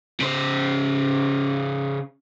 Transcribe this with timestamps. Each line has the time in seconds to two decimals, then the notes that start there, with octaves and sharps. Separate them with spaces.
0.21 C#3 C5